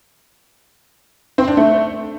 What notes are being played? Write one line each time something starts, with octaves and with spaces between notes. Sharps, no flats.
C4
D4
A3